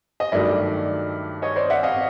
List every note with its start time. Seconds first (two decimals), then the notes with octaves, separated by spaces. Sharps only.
0.20 D#5
0.32 G2 D#3 F#3 A3 D5 E5
1.42 C#5 D#5
1.56 C5 D5
1.70 E5 F#5
1.83 D#5 F5